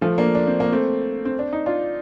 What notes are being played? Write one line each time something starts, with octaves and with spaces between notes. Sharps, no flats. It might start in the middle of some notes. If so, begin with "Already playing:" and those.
F3 A3
A#3 D4
D4
C4
A#3
A3 C4
C4
D4
D#4
D4 F4